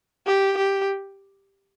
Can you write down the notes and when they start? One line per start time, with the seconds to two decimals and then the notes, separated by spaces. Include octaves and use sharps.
0.27 G4
0.57 G4